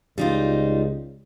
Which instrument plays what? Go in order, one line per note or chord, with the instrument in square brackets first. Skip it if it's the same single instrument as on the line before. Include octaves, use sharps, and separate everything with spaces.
[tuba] C#2 [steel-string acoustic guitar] G3 D#4 F4